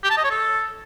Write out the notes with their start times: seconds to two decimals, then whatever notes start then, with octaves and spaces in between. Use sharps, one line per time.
0.04 G4
0.10 A5
0.17 D#5
0.24 C#5
0.31 A4